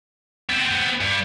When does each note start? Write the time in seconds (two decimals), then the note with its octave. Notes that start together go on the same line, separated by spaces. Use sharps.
0.49 B3 C4
1.01 G2